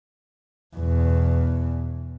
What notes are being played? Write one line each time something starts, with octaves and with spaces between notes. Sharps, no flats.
E2 B2